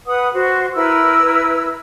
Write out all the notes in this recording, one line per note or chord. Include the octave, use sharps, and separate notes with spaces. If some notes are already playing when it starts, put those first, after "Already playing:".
B4 F#5 D#6
F#4 C5
E4 A#4 B4 E6